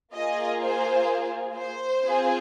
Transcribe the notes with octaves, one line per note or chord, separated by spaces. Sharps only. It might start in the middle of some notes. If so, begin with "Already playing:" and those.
A#3 F4 G#4 D#5
C5
C5
C4 F4 G#4